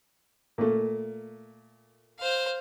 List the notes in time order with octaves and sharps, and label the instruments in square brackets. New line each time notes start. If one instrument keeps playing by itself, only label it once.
[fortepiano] A#2 A3
[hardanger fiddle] C5 F5